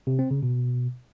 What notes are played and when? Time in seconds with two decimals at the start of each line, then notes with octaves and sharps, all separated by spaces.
0.07 C3
0.19 C4
0.31 C#3
0.43 B2